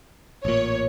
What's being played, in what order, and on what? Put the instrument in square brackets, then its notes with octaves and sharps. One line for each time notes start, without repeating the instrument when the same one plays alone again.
[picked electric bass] A1 A#2 [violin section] C#5